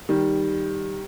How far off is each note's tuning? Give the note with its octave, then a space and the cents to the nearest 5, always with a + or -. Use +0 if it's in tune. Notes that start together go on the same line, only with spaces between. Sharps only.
D#3 +0 G3 +0